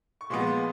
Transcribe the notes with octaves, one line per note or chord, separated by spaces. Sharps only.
C#6
A#2 F3 G#3 B3 C6
C6